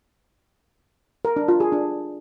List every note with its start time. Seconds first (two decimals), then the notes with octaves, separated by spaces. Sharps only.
1.25 A#4
1.36 D4
1.48 F4
1.60 G#4
1.72 D4